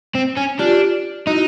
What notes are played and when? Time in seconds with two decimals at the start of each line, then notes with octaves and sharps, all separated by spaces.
0.15 C4
0.37 C#4
0.59 D4 F4 G4
1.27 D#4 E4 F#4